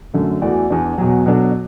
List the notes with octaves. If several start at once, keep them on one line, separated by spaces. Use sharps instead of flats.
F#2 D3 A3
E2 E3 A3 F#4 D5
E2 E3 D4
E2 B2 F#3
B2 F#3 D4 A4